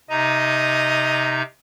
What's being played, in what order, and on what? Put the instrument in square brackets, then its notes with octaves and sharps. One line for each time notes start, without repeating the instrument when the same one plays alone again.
[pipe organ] C3 D#4 A#5 [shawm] D#5